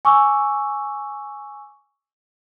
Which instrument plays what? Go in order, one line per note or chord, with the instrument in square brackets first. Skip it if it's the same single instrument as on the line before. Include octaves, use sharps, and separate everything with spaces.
[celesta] G#5 C#6 D6 E6